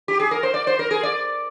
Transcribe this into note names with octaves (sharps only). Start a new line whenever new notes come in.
G4
G#4
A#4
C5
D5
C5
A#4
G#4
D5